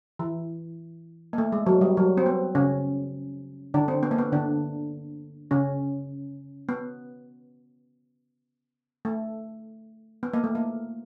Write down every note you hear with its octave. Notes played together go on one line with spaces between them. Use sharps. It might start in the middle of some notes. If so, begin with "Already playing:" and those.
E3
A#3
A3
G#3
F#3
G3
F#3
C4
B3
C#3 C#4
D3 D4
C4
B3
A#3
B3
D3 D4
C#3 C#4
B3
A3
B3
A#3
A3
A#3